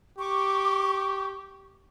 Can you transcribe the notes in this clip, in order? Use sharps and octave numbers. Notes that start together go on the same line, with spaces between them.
G4 C#6 D6